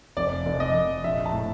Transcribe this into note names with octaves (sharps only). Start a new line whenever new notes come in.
F1 D5
F1
D#5
F1
A#1 E5
A5
A2